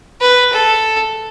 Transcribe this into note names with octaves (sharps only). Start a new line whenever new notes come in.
B4
A4